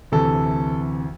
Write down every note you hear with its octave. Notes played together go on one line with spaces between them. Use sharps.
D2 C3 E3 A4